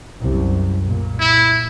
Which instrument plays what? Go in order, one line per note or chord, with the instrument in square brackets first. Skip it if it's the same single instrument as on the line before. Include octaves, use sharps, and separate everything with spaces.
[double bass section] C2 F#2
A#2
[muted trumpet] E4